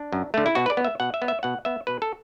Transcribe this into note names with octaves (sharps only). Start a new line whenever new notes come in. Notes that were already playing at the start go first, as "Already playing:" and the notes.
Already playing: D4
F#2
D3 A3
E4
B2 F#4
B4
D5
B3
E5
B2 F#5
E5
B3
E5
B2 F#5
B3 E5
B2 B4
A4